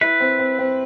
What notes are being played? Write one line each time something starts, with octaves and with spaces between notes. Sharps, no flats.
E4 B4
C4
C4
C4